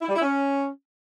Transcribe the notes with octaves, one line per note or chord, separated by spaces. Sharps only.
E4
G3
E4
C#4